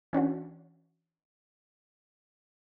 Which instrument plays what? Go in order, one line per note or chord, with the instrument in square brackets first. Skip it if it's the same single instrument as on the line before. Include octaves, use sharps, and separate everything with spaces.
[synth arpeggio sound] E3 C#4 D4 F#4